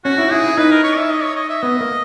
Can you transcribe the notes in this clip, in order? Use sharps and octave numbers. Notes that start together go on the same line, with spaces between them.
C#4 F#4
E4
E4 G#4
E4
D#4 B4
A#4
C#5
E5
D#5
C#5
D#5
E5
B3 D#5
A#3